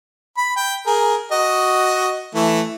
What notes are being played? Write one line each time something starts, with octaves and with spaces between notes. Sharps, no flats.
B5
G5
G#4 A#4
F#4 D#5
E3 A3